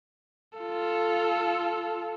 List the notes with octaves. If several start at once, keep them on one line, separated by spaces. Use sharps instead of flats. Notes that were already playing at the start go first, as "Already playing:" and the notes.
F4 A4